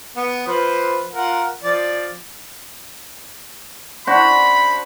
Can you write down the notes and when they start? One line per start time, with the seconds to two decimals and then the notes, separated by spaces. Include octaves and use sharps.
0.17 B3
0.47 F3 B4 C5
1.13 F4 A#4 F#5
1.63 F3 D5
4.07 D4 F#4 C5 B5